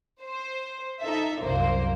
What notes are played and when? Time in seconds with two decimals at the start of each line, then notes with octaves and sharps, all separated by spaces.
0.20 C5
1.00 D#4 A4 E5
1.42 C2 F#2 A#3 C5